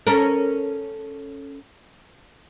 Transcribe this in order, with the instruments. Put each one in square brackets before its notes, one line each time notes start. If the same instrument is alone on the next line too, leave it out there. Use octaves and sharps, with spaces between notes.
[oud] C#4 A4 A#4